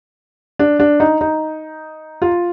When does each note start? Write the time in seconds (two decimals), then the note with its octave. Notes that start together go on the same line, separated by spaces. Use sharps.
0.59 D4
0.80 D4
1.00 D#4
1.21 D#4
2.22 F4